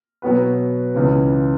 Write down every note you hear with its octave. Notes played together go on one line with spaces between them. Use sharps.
B2 F#3 B3 F#4 B4
C#2 C#3 E3